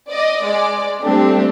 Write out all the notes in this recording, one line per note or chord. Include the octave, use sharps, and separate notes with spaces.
D5 D#5
G#3 D5
G3 A3 C4 D4 G4